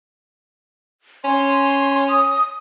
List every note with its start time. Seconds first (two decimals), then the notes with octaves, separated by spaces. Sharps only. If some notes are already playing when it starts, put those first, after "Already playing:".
1.25 C#4 C6
2.09 D#6